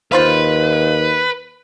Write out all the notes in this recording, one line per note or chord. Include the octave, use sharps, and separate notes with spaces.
D#2 F4 B4 C5 F5